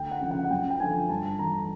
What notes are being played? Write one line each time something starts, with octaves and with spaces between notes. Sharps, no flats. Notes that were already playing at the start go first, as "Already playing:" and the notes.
Already playing: D2 G5
F#5
C#3 F3
F#5
F#5
F#2 G5
G5
D3 F3 G#5
G2 A5
E3 A#5